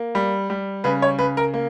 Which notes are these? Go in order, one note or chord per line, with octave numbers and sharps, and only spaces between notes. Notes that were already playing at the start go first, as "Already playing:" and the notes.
Already playing: A#3
G3
G3
C#3 B4
C#5
C#3 B4
A#4
A#3